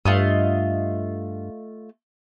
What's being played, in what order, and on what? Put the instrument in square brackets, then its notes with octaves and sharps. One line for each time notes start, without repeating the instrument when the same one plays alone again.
[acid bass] G2 [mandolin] A3 F4 D#5